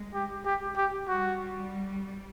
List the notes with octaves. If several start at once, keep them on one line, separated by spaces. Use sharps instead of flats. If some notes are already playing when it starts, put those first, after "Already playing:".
Already playing: G#3
G4
G4
G4
G3 F#4